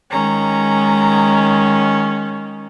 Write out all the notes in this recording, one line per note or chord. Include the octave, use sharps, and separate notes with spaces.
D#3 G#3 C#4 A#5